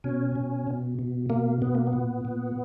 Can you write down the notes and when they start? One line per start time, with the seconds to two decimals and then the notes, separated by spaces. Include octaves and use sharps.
0.04 B2 C#4
0.35 B2
0.67 B2
0.99 B2
1.30 B2 A#3
1.62 B2 B3
1.75 A#3
1.87 B3
1.93 A#2
2.25 A#2